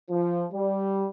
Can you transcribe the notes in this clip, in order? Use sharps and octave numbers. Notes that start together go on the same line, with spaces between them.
F3
G3